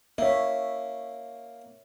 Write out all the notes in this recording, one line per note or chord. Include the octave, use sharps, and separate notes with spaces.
A#3 C#5 E5